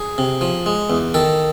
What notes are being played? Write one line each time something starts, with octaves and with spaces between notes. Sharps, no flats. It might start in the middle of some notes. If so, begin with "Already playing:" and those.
Already playing: G#4
C3
F3
G#3
E2
D#3 A4